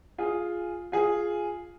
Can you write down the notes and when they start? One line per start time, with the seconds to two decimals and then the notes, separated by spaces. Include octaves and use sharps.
0.18 F4 G#4
0.92 F4 G#4